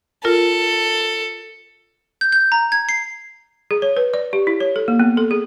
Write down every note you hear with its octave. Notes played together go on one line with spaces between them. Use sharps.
F4 A4 A#4
G6
G6
A#5
G#6
C7
G#4
C#5
B4
D5
G4
E4
C#5
A4
A#3
B3
A4
G#4